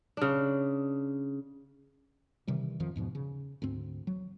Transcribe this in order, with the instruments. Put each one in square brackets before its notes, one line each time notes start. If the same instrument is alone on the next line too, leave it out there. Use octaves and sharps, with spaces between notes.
[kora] C#3 D4
[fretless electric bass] C3 D#3 E3 G3
G#1 F2 D#3 F3
E2 G#2 B2 F3
C#3
D2 G#2 C4
F#3